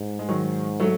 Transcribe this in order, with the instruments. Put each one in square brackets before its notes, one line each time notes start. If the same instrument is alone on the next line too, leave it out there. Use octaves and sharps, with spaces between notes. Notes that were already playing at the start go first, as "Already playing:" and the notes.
Already playing: [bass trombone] G#2
[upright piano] G#3
D#3 F#3
F#3 A3